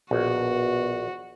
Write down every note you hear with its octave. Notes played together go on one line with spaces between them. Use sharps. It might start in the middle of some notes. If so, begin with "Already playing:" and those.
A#1 B2 F#4